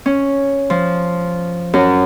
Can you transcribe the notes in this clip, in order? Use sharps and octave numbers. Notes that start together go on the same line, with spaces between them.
C#4
F3
F#2